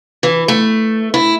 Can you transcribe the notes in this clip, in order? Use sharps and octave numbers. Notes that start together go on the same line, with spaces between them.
E3
A3
E4